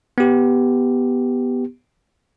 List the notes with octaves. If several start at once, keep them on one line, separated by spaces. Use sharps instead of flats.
B3 G4